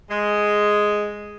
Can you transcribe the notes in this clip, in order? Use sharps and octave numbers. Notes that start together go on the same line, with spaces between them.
G#3